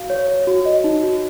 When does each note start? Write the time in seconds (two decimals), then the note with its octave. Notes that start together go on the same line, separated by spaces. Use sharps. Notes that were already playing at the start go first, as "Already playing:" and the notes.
Already playing: F#4 F5
0.10 C#5
0.28 C#5
0.47 F#4
0.65 D#5
0.84 D#4
1.03 F#4